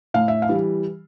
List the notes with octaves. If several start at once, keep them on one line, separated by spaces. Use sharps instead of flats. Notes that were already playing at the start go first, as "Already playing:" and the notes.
A2 F5
E5
F5
E3 G3